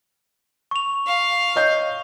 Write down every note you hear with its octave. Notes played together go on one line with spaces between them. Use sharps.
C#6 F7
F5
C#5 D#5 G6